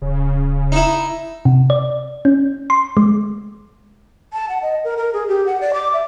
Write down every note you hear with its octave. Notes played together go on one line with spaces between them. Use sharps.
D1 C#3
D#4 E4
C3
D5
C#4
C6
G#3
A5
F#5
D#5
A#4
A#4
G#4
G4
F#5
D5
D6
E5